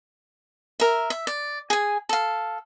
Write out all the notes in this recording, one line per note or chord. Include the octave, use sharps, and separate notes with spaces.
A#4 E5
E5
D5
G#4 G#5
A4 F5